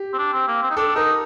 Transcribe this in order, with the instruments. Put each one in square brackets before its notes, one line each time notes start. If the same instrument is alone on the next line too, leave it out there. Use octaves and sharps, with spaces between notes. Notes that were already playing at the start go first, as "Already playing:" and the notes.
Already playing: [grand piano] G4
[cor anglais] C4
D4
C4
A#3
C4
D#4
[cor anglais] D4 [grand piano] A4
[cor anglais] D#4 [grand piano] A#4